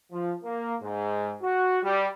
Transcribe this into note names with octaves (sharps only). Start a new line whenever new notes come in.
F3
A#3
G#2
F#4
G3